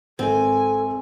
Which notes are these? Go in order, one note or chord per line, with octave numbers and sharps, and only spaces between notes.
G#1 C4 A4 G#5